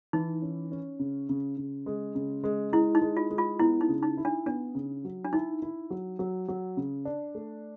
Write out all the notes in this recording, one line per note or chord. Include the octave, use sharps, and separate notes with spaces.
E3 D#4
C#4
C#4
C#3
C#3
C#3
G#3
C#3
G#3
G#3 E4
D#4
G#3
F4
G#3
F4
B3 E4
D#4
C#3
D#4
E4
D4
B3 D4
C#3
F#3
D4
D#4 E4
E4
F#3
F#3
F#3
C#3
D4
A3